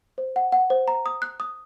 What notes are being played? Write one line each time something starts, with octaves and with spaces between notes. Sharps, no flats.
C5
F#5
F#5
C5
A#5
D#6
F#6
D#6